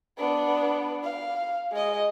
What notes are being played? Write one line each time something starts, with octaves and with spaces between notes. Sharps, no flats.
B3 D4
F5
G#3 D#5